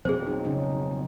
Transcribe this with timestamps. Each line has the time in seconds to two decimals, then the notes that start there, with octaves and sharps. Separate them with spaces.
0.05 B1 F2 F#3 C4 G#4 C5
0.27 D#4
0.45 C#3 C#4 D#4